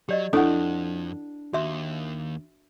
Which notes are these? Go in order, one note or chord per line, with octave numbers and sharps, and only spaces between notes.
F#3 G4 D5 D#5
F2 D4 E4 A4 F#5 D#6
D#2 F#4 E5 C6